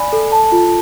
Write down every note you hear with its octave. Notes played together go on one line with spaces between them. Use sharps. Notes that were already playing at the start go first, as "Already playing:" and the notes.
Already playing: D5 G#5 B5
A4
A5
F4